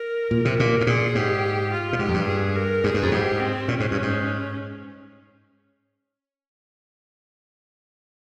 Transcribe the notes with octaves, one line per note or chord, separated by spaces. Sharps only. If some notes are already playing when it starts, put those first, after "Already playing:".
Already playing: A#4
A#2
C3
A#2
G#2
A#2 G#4
G#2 G4
F4
A#2
G#2 G4
F2
G2
G#4
A#4
G2 G#4
G2
F2
G#2 G4
C4
A#2 C#4
G#2
G2
G#2